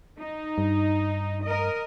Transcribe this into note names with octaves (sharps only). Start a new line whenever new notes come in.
D#4
G2
A#4 D#5